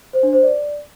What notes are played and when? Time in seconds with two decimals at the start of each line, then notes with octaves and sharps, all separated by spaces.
0.13 C5
0.23 D4
0.33 C5
0.43 D5